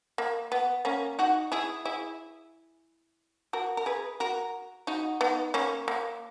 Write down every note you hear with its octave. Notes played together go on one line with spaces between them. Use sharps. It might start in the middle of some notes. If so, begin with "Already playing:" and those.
A#3
B3
A#3 C#4
D#4 F#4
E4 G#4
E4 G#4
F#4 A#4
A#4
G#4 B4
F#4 A#4
D#4 F#4
B3 D#4
A#3 C#4
A#3